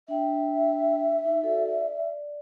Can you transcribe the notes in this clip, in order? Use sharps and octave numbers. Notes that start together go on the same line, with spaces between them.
D4 E5 G5
D#4
F#4 A4 D5
D5